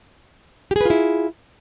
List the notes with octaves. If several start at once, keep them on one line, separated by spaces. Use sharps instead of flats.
E4 F4 G4 G#4 B4